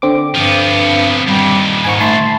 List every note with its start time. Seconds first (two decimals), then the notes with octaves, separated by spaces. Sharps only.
0.02 D3 C4 D6
0.35 G2 F3 B3
1.27 D#2 A#2 G3
1.84 G#2 G#5 C#6
2.01 A3 A5 B5 C6